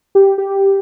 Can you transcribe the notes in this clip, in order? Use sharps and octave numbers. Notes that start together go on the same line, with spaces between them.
G4
G4